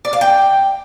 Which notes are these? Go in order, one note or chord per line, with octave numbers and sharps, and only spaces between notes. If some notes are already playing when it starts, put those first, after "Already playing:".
D5
F5
G5